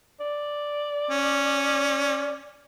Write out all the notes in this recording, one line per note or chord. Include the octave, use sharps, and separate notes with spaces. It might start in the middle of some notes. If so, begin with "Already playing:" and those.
D5
C#4